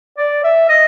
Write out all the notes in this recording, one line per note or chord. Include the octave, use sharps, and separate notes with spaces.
D5
E5
D#5